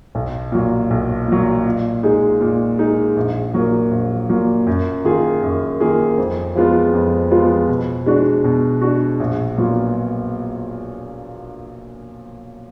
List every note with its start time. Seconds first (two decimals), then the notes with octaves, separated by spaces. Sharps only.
0.15 B1
0.52 A#2 F#3
0.90 B1
1.28 A#2 F#3
1.65 A#2
2.03 G#3 D#4 G#4
2.41 A#2
2.79 G#3 D#4 G#4
3.16 A#1
3.54 A#2 F#3 A#3
3.91 A#1
4.29 A#2 F#3 A#3
4.67 F#2
5.04 D#3 A#3 F4 G#4
5.43 F#2
5.80 D#3 A#3 F4 G#4
6.18 F2
6.55 F3 G#3 B3 F4
6.94 F2
7.31 F3 G#3 B3 F4
7.69 B2
8.06 G#3 D4 F#4
8.44 B2
8.82 G#3 D4 F#4
9.20 A#1
9.58 A#2 F#3 B3 F4